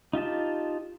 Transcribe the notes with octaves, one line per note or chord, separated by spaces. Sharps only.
D#4 F4 G4 A5